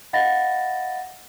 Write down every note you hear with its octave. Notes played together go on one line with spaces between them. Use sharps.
D#5 F5 F#5 B5 A6 A#6